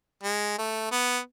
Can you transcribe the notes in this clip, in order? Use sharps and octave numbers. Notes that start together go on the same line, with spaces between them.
G#3
A3
B3